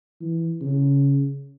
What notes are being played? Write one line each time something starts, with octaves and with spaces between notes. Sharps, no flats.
E3
C#3